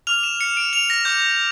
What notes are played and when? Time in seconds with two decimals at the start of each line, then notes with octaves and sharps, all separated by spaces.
0.07 D6 F6 F7
0.23 E7
0.41 C#7
0.57 D7
0.73 F7
0.90 A#6
1.05 D6 G6